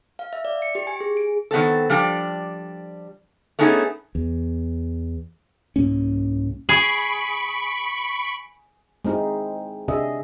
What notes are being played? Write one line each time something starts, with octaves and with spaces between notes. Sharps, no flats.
F5
E5
D5
C#7
G4
G#5
G#4
D7
D#3 B3 C4 A4
F3 G3 D4 G5
A3 B3 C#4 D#4 G4 G#4
E2
C2 G#2 A#3 C#4
G#4 B5 C#6 D7
G#3 C4 D#4 E4 G#4
C3 D4 G#4 D#5 E5